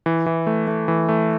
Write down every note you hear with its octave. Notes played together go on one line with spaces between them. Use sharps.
E3
E3
A3
A3
E3
A3